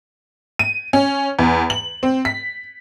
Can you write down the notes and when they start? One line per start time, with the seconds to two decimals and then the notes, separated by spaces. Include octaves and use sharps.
0.59 D#7
0.93 C#4
1.39 E2
1.70 F#7
2.03 C4
2.25 B6